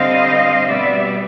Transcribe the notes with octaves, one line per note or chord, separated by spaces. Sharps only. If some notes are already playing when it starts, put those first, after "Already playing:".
Already playing: D3 G3 C4 D#5 F5
B2 G3 B3 D5 E5